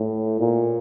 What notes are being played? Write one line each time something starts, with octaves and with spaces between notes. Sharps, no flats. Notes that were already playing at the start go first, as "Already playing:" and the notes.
Already playing: A2
A#2